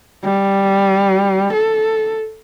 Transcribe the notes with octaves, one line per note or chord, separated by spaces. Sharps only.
G3
A4